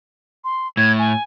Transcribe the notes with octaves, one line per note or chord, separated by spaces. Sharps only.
C6
A2 G#6
G#5